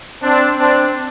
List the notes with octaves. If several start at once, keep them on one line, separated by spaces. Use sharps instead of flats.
C4 D4
C4 D4